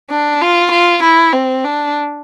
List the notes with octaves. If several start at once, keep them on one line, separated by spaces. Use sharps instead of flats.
D4
F4
F4
E4
C4
D4